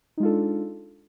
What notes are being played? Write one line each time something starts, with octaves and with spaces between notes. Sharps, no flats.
G#3 D4 D#4 F4 A4